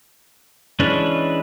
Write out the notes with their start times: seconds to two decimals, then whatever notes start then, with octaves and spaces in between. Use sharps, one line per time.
0.80 E3 G#3 C#4 D4 B4